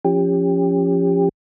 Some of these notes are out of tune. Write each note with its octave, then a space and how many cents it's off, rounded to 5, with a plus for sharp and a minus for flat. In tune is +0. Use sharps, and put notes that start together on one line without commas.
F3 +0 C#4 +0 G4 +25